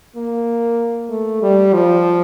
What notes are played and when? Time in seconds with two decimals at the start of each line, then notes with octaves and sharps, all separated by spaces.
0.16 A#3
1.10 A3
1.42 G3
1.73 F3